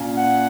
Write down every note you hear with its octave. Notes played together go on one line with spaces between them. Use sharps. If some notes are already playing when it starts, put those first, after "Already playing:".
Already playing: A#2 A#3 C#4
F#5